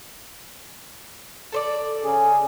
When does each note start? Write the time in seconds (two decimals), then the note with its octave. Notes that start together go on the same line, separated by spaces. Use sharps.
1.52 A4 C5 D5
2.03 C#3 G#4